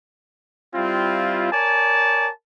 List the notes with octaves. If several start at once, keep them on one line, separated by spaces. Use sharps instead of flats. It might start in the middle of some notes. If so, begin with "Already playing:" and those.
G3 C4 E4 F4
A#4 C#5 D5 G#5 A5